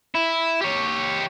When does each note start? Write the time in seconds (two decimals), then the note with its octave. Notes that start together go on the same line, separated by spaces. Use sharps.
0.15 E4
0.61 G4 C#5